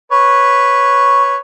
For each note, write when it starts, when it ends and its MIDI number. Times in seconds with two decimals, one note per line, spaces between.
0.12 1.36 71
0.12 1.36 73